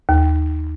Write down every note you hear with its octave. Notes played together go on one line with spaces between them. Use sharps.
D#2